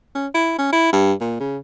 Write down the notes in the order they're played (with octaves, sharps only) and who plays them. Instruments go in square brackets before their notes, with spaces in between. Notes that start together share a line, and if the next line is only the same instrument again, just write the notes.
[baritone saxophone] C#4
E4
C#4
E4
G2
A#2
C#3